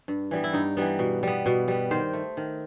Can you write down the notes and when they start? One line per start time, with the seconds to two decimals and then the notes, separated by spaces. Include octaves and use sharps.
0.08 G2
0.31 E3 G3 B3
0.44 E4
0.53 G2 D#4
0.77 E3 G3 B3
0.99 B2
1.23 G3 B3
1.46 B2
1.68 G3 B3
1.91 D#3 C5
2.13 A3
2.37 D#3